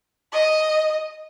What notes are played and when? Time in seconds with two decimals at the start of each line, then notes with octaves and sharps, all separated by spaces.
0.32 D#5